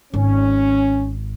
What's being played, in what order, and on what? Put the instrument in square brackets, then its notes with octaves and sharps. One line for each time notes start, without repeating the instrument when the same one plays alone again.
[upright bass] G#1 [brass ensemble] C#4